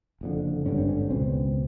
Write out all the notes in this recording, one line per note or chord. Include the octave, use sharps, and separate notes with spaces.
F#1 F2 D3
G#1 G2 D3 C#4
C4
C#4
C#2 B2 C4